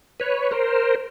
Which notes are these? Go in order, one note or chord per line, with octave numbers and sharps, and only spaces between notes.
B4 C#5
A#4 C5